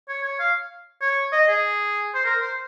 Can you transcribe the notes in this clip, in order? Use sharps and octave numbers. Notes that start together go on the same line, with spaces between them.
C#5
C#5
F5
C#5
D#5
G#4
C5
A#4
C5